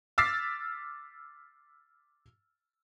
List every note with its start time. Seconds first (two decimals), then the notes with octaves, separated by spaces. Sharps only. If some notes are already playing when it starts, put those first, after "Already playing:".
0.18 D6 E6 F6 A6 B6 C7